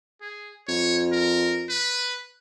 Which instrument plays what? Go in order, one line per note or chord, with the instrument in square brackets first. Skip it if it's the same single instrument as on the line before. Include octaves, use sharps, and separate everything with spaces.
[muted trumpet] G#4
[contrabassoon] F2 [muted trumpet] C#5
[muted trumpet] A#4
B4